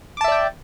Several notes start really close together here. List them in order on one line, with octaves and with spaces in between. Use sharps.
D6 A5 E5 D5 G5